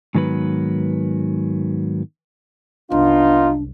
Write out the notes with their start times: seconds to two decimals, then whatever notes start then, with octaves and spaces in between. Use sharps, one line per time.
0.15 G#2 D#3 F#3 B3 B4
2.90 F#1 C2 B3 D4 D#4 F4